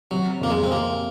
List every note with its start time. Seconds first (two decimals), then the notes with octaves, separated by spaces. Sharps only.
0.11 C3 F#3
0.41 F2 A#3
0.50 G#3
0.64 C4
0.71 C3 A#3